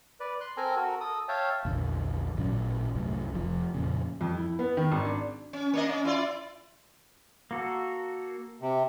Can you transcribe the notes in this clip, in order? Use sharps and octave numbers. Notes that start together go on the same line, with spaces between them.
B4 D5
C6 F#6
C4 A4 A#4 G#5 A#5
F#4 A4 A#4
A4 D#6
C#5 E5 F5 G5 A5
A#1 E2 D3
A1 A#2 F#3 C#4
C2 F#2 A2
F1 F3
F2 A#2 C#3
F2
E4
B3
D#3
G#1
D4
C#4
A#3 D4 D#5
C#4
E4 F4 D5
A#3 F#4 A4
C3